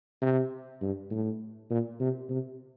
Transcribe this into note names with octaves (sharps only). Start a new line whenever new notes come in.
C3
G2
A2
A#2
C3
C3